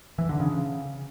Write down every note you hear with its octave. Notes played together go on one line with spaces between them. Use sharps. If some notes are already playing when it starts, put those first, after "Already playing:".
E3
D3
C#3